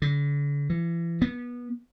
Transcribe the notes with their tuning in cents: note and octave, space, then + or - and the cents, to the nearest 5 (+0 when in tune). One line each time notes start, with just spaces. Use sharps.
D3 -40
E3 +35
B3 -25